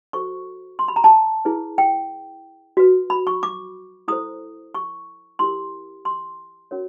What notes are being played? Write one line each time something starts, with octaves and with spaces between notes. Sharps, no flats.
F#4 A4 C5 C#6
C6
B5
A#5
A5
E4 G#4 B4
G5
F#4 B4
B5
C#6
D6
E4 A4 C5 D#6
C#6
E4 G4 A#4 C6
C6
C#4 F#4 A#4 C#5